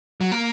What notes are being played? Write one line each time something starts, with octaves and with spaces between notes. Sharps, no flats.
F#3
A#3